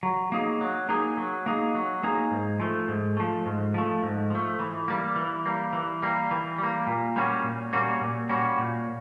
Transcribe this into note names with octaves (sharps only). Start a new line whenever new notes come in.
F#3
A#3 D#4 G#4
F#3
A#3 D#4 G#4
F#3
A#3 D#4 G#4
F#3
A#3 D#4 G#4
G#2
F3 A3
G#2
F3 A3
G#2
F3 A3
G#2
F3 A3
E3
G3 A#3
E3
G3 A#3
E3
G3 A#3
E3
G3 A#3
A#2
G3 A#3 C#4 F#4
A#2
G3 A#3 C#4 F#4
A#2
G3 A#3 C#4 F#4
A#2